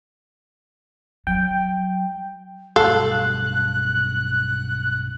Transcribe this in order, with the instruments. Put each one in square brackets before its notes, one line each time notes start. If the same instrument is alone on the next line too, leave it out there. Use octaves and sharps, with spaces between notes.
[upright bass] F#3 [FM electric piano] G5
[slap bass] B1 G2 A3 [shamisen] A4 F5 [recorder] F#6